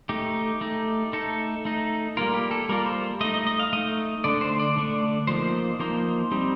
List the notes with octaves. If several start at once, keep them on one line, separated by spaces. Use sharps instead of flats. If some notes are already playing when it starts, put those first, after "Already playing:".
A3 D#4 G4
A3 D#4
A3 D#4 A4
A3 D#4
G3 A#3 F4 A#4
G4
A4
G3 A#3 F4 A#4
C5
A3 D#4 D#5
D#5
D#5
F5
A3 D#4 D#5
D3 A3 D4 D5
C5
D5
D3 A3 D4
F3 A#3 D#4 C5
F3 A#3 D#4 C5
G3 C4 D#4